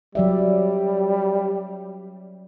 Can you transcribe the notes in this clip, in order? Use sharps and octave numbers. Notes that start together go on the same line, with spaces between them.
F#3 G3 D5 E5